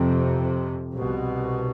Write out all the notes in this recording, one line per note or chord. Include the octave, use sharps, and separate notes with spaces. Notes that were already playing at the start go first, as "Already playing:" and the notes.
Already playing: F2 C3
C2 B2